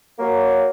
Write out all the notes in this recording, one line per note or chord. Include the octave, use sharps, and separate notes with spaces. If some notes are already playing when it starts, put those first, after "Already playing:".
F#3 A#3